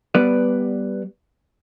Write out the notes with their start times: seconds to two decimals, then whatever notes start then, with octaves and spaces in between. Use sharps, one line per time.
0.15 G3 B3 B4 D5